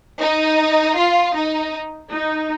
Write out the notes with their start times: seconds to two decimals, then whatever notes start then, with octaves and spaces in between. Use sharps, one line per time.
0.21 D#4
0.97 F4
1.36 D#4
2.12 D#4